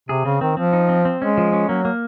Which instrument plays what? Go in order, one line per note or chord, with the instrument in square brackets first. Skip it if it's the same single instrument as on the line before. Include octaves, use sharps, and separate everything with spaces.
[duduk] C3 [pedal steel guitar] G#4
[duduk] C#3 [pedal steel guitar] C4
[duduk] D#3 [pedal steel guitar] C4
[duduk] F3 [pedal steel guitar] C4
[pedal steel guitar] D#4
C4
C4
[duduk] G#3 [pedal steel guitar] C#4
[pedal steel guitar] F3
C#4
[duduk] F#3 [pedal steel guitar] A#3
[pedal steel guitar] A#3